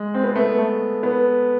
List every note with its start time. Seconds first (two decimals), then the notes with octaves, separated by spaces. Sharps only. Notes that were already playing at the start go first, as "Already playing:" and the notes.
Already playing: G#3
0.14 C4
0.24 B3
0.35 A3
0.41 B3
0.58 A3
1.03 B3